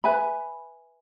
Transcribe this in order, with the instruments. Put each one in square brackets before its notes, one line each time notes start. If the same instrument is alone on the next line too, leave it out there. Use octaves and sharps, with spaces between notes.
[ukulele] B4 E5 G#5 B5